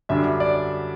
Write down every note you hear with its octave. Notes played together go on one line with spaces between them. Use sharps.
F#2 D3 G3 D4 E5
D5